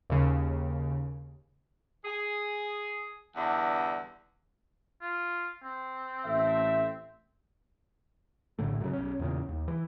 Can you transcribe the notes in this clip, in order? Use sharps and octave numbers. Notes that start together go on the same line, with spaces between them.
D#2 C#3
G#4
E2 G2 D3
F4
C4
A1 A3 E5
A#1 A2 D3 A3
F#2 C#3
B1 C#4
E2 A#2 C#3
D#2
E3